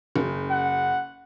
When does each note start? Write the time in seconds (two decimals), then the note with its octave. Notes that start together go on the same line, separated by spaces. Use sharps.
0.16 F#1
0.51 F#5